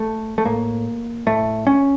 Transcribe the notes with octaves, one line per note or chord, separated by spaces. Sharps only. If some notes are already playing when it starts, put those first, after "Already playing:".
Already playing: A3
A3
A2 A#3
A2 A3
C#4